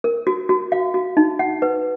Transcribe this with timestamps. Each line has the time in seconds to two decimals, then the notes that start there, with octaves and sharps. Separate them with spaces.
0.04 A#4
0.27 F#4
0.49 F#4
0.72 F5
0.94 F#4
1.17 D#4
1.39 F#5
1.62 B4